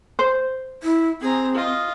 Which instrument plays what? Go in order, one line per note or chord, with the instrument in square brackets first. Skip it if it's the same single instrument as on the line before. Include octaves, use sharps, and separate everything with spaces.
[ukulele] C5
[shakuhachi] E4
[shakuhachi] C4 [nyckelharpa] G#4 A#5
[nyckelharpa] F4 D#5